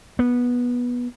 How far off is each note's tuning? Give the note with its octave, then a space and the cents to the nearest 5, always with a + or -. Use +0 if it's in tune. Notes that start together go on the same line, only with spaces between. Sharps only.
B3 -15